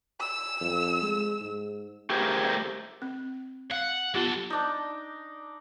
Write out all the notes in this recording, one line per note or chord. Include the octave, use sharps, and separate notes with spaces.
E6
F2
G#3
G#2
A3 G4 G#4 A#4 C5
C4
F5 F#5
F#3 B3 F4 G4 A4
D4 D#4